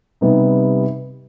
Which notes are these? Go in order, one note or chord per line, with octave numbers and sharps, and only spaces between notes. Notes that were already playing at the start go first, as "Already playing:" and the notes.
C3 G3 B3 D#4